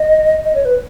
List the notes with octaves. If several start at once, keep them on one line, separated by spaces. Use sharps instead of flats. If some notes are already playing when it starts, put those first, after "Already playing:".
Already playing: D#5
D#5
C#5
B4